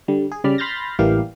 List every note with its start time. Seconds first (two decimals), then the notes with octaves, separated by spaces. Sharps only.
0.08 D3 G3
0.32 G#4
0.44 C#3 G3 D5 B5 F6
0.58 B5 C6 F6 G6 A6 A#6
0.99 A1 E3 G3 A#3 G4 F5